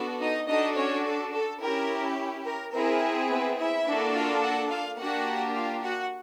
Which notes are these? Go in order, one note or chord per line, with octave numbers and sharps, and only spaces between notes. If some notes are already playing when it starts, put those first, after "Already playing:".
Already playing: B3 D4 F#4 A4
D#4 D#5
D4 D#4 F#4 A4 D#5
C#4 C#5
A4
A4
C#4 E4 G4 A#4
A#4
C4 E4 G#4 A#4
B3 B4
E4 E5
A#3 D4 F#4 A4
F4 F5
F#4 F#5
F4 F5
A#3 D4 F#4 G4 F#5
F4 F5
F#4 F#5